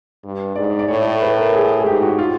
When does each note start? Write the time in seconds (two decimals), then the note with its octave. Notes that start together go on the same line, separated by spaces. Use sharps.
0.24 G2
0.56 G#2 D5
0.79 D5
0.88 A2 C#5
1.22 B4
1.38 A#4
1.54 G#4
1.79 G#4
1.86 G#2 G4
2.03 F#4
2.19 F4